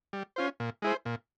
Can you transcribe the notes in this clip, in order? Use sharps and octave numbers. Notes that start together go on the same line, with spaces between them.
G3
C#4 F4 C5
A#2
G#3 E4 G#4 C5
A#2